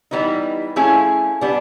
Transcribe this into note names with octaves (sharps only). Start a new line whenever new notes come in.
E3 G3 B3 D#4
F3 A3 C#4 E4 G#4
G3 B3 D4